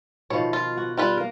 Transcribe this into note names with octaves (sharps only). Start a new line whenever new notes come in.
B2 D#3 F3 C#5
F4
F#4
G3 F4 B4
A#3 A#4